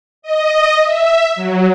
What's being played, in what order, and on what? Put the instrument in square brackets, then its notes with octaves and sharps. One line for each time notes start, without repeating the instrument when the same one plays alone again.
[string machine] D#5
E5
F#3